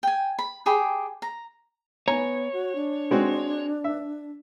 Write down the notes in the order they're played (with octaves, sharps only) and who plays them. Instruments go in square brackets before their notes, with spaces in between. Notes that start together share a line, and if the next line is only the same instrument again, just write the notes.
[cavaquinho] G5 G#5
B5
G4 G#4 G5 B5
A#5
[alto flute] B3 [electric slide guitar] C#5 [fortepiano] G#5 A#5
[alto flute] F#4
D4
[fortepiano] G#3 C4 F#4
E5